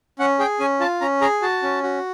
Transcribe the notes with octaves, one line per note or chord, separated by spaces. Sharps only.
C#4 F#5
G#4 G5
C#4 G#5
F4 A5
C#4 A#5
G#4 A#5
F#4 A5
C#4
F#4